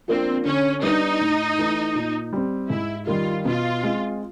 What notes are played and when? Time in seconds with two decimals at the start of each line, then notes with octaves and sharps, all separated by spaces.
0.08 F3 A#3 C4 D4
0.45 D3 C#4
0.82 G3 B3 D4 D#4
1.20 A2
1.58 E3 A3
1.95 A#2
2.33 G3 C4
2.70 G#2 E4
3.07 D#3 G3 F4
3.45 B2 F4
3.82 G#3 C4